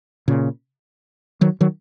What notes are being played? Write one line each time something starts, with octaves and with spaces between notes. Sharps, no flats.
A#2 C#3
D#3 F#3
D#3 F#3